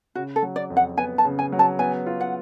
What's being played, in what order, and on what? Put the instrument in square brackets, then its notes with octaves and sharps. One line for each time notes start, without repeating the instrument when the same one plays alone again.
[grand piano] C#3 [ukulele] F#4
[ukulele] A4
[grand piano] F#3
[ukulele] D5
[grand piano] F2
[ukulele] F#5
[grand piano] B3 [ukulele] G#5
[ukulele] A5
[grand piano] C#3
[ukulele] G#5
[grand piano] F#3
[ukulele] A5
[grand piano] B3 [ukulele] G#5
[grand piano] F4
[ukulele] F#5